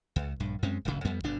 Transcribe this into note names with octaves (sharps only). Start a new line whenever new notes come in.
C#2
A#1 G2
F#2 G#3 C4 C#4
D1 G#1 D2 C#3
F2 G3 B3
G1 B2 D4